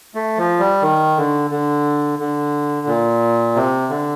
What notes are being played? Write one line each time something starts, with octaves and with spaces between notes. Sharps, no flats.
A3
F3
G3
D#3
D3
D3
D3
A#2
C3
D3